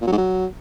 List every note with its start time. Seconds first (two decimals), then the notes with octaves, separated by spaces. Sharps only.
0.02 A#2
0.07 F#3
0.12 G#2
0.18 F#3